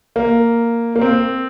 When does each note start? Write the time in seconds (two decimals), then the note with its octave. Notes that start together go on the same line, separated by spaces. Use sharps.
0.16 A#3
0.96 A#3
1.01 C4